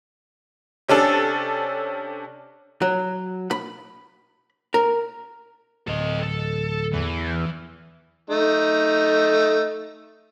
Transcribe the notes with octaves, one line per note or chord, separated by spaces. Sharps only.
C3 C#4 D4 A4
F#3
B5
A#4
D1 A4 D#5
A4
E2 E3
A3 D#4